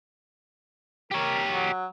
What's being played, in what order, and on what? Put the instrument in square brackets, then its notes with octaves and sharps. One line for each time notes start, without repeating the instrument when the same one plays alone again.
[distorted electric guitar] G4 C#5 [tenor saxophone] A#4
[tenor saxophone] F#3